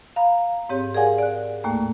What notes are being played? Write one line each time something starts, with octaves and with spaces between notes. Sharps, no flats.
F5 A#5 B5
G#2 C4 G4 C#5
G#4 A#4 D5 F5 F#5 G#5
D5 F#6
D#2 A2 A3 A#3